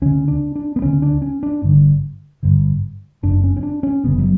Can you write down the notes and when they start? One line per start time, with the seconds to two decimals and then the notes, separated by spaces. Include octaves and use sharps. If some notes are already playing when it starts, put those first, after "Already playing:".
0.02 D2 C#3 C#4
0.28 D4
0.56 D4
0.76 B3
0.82 D2 C#3 C#4
1.02 D4
1.22 C#4
1.43 D4
1.62 G1 G2 D3
2.43 G1 G2 D3
3.23 F#1 F#2 C#3 D4
3.44 C#4
3.57 C#4
3.63 D4
3.83 C#4
4.04 F#1 F#2 C#3 B3
4.18 F#3